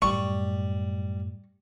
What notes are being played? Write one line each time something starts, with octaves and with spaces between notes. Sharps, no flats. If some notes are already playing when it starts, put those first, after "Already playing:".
F#2 A2 G3 C#6